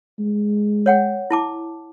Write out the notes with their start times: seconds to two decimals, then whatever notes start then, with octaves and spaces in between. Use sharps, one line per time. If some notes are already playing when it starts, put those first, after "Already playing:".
0.19 G#3
0.86 C#5 F#5 G5
1.31 E4 A5 D6